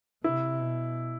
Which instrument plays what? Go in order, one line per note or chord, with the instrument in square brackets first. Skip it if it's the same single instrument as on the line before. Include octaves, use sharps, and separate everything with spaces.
[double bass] C3 [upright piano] E4
[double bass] B2